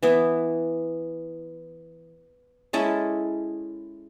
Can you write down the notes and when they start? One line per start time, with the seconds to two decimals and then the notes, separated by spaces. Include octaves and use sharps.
0.03 E3 B3 E4
2.73 G#3 C#4 E4 A4